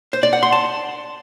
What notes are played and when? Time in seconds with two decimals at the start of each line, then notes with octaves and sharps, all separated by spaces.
0.13 C5
0.23 D5
0.33 F#5
0.43 C6
0.52 A5